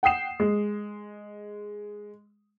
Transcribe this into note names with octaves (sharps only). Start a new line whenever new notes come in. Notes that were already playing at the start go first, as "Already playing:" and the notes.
F#5 G5 D#6 C7 E7
G#3